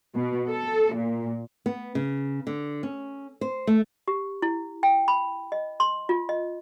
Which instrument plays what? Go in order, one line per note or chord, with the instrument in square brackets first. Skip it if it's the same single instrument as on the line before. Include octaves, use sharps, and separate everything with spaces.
[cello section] B2
A4
A#2
[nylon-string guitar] B3
C#3
D3
C#4
C5
A3
[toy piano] G4
E4
G5
B5
D#5
C6
F4
D#5